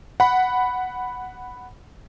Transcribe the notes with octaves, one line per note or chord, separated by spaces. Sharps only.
F#5 B5